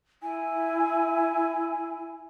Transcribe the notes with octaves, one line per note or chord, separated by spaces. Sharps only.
E4 G#5